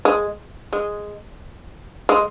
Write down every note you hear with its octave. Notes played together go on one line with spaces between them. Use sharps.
G#3
G#3
G#3